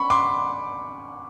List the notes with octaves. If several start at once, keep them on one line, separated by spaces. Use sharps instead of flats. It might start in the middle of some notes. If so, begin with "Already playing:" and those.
Already playing: B5 C#6
C6 D6